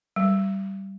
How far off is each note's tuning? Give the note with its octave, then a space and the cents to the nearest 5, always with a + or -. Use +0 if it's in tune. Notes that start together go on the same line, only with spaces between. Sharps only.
G3 -10